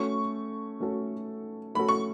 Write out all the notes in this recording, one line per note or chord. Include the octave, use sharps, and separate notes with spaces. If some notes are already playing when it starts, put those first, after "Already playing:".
Already playing: A3 C#4 F#4 A4 C#6
A3 C#4 F#4 A4
A3 C#4 F#4 A4 B5
C#6